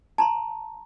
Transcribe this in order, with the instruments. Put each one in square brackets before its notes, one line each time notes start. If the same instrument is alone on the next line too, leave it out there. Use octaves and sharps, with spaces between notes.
[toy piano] A5 A#5 C6